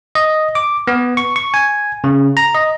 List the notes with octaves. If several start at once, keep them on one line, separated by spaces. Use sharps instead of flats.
D#5
D6
B3
C#6
C#6
G#5
C#3
A#5
D#5